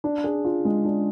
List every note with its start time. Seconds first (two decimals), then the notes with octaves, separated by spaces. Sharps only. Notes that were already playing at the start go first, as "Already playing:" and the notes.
0.04 D4
0.24 G#4
0.45 F4
0.65 G#3
0.85 D4